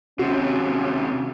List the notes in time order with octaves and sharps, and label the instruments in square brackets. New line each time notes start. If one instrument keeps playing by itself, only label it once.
[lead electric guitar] D#2 C3 [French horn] C#4 [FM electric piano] F#4